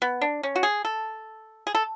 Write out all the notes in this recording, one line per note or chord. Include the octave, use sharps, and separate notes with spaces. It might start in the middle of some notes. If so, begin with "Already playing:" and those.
B3
D4
C#4
F#4
G#4
A4
G#4
A4